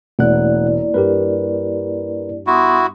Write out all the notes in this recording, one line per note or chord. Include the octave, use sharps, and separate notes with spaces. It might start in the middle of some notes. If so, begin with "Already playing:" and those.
E1 A3 A#3 E4 D5 F#5 F#6
G2 G4 A#4 B4
B3 E4 F#4 C6 D#6